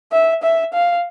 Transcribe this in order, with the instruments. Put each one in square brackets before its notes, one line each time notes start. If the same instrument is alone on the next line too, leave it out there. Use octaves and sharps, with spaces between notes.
[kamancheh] E5
E5
F5